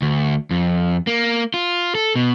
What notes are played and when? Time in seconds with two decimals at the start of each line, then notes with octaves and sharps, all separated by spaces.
0.02 D2
0.51 F2
1.07 A#3
1.54 F4
1.95 A4
2.16 B2